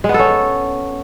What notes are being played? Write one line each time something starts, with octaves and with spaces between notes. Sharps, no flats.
G#3
B3
A4
C#4